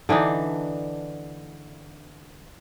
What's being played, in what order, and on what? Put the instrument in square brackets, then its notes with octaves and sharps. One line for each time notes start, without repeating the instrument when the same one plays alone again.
[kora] D3 E3 D4 D#4